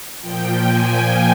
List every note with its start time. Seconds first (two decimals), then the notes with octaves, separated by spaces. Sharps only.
0.21 A#2 F3 G5
0.66 G#5